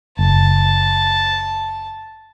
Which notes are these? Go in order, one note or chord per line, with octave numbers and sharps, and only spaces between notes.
F#1 A5